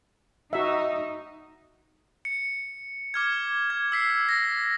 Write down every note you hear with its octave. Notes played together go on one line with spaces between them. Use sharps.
D#4 F#4 E5
C#7
D6 F6 G#6
G#6
E6 B6 C7
A#6